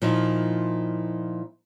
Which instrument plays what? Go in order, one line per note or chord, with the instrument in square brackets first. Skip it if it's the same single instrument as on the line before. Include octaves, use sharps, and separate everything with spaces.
[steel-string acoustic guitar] A#2 F3 D#4 E4